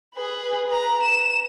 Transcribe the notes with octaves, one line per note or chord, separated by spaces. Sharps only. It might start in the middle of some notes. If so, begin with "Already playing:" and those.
G#4 B4
B4 A#5
E7